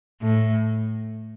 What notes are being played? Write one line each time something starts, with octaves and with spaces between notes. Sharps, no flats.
A2